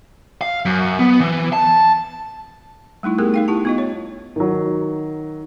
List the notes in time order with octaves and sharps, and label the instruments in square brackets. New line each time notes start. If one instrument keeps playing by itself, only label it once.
[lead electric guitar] F5
F#2
B3
E3
A5
[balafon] G3 A3 D#4 E4
A3 B3 G4 G#4 A#4
D#4 F5 G5
E4 G4 F#5 A5
B3 F4 D#5
C#5
[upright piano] D#3 F#3